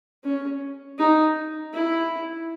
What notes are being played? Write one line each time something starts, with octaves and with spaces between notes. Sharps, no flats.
C#4
D#4
E4